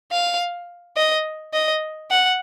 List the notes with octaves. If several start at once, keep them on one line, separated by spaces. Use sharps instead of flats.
F5
D#5
D#5
F#5